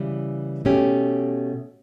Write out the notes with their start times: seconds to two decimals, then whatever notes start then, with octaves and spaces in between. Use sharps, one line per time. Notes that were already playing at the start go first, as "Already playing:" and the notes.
Already playing: C#3 E3 G3
0.65 B2 A3 C#4 G4